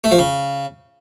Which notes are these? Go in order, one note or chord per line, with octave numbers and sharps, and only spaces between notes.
A3
F3
C#3